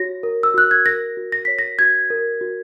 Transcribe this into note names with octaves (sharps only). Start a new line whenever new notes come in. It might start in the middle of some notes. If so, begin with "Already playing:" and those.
Already playing: F#4 C#5 A#6
A#4
E6
F#4 F#6
G#6
A#4 A#6
F#4
A#6
C#5 B6
A#6
F#4 G#6
A#4
F#4